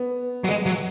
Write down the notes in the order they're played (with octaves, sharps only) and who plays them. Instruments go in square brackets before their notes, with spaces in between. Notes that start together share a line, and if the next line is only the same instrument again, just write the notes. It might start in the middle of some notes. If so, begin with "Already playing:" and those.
Already playing: [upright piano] B3
[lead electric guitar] F#3
G#3
F#3